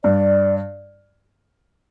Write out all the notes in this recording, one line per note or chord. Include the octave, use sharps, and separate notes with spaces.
G2 D5